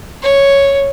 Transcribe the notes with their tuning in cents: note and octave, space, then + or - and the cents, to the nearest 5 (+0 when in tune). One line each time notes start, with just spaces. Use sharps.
C#5 +0